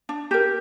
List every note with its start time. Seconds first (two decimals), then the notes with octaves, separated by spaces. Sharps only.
0.09 D4
0.31 G4 A#4